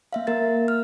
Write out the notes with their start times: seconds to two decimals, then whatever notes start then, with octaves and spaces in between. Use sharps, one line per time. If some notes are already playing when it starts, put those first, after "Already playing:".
0.13 A#3 E5 F5
0.27 A#3 A#4 A6
0.68 F6